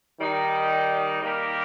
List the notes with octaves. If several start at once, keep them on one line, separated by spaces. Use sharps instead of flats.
D#3 G3 D#4 G4
D#3 G3 A#3 G4 A#4